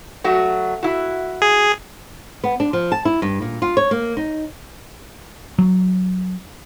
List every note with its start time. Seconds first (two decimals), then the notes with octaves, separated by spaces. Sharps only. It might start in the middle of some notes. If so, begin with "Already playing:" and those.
0.24 F#3 A3 F#4
0.83 E4 F#4
1.42 G#4
2.44 B3
2.60 D4
2.73 F3
2.92 A5
3.05 E4
3.22 G2
3.42 A#2
3.62 F4
3.77 C#5
3.91 A#3
4.17 D#4
5.58 F#3